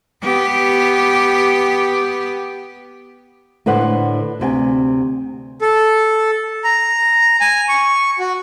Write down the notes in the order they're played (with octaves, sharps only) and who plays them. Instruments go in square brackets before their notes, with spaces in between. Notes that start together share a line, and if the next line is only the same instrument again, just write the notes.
[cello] B3 G4
[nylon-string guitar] A2 D3 B4 C5 F#5
D2 C3 G5 G#5
[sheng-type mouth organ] A4
A#5
G#5
C#6
F#4